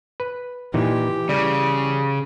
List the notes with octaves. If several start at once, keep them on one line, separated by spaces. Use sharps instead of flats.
B4
A#2 E3 D#4 G4
C#3 G3